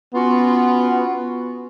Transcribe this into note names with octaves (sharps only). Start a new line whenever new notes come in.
B3 C#4 F4 F#4